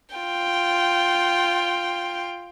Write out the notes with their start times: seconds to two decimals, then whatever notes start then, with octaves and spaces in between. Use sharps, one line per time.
0.16 F4 G5